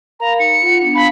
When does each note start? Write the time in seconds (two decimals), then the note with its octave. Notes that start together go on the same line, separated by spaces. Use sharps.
0.20 A#4 F5 A#5 B5
0.39 D#4 C#7
0.62 F4 F#5
0.82 B3 D4
0.95 F5 A5 B5